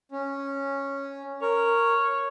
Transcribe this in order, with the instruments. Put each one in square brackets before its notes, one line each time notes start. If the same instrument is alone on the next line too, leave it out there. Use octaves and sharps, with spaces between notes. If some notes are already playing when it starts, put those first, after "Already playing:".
[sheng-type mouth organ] C#4
[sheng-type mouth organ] A#4 [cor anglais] C#5